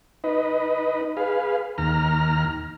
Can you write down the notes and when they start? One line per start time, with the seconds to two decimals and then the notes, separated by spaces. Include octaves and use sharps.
0.24 D#4 B4 D#5
1.17 G#4 B4 F5
1.78 D#2 A#5 F6